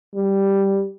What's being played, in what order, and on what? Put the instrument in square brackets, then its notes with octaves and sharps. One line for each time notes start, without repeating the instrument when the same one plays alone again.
[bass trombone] G3